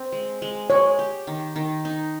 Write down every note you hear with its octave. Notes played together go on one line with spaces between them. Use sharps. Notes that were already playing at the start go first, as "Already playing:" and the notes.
Already playing: C4
G#3
G#3
G#3 C#5
G4
D#3
D#3
D#4